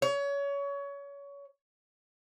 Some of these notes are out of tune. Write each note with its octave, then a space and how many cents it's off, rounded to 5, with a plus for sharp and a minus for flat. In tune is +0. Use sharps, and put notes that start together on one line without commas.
C#5 +25